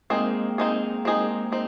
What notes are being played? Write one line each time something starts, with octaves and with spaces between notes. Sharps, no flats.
G#3 A#3 C4 D#4 G#4
C4 D#4 G#4
G#3 A#3 C4 D#4 G#4
C4 D#4